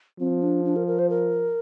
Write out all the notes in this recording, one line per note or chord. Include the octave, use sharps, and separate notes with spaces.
F3 C4
D4
D4
A#4
A#4
C5
A#4